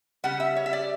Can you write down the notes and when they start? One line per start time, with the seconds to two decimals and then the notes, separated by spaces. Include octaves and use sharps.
0.24 C#3 G3 F#5
0.40 E5
0.56 C#5
0.66 E5
0.73 D5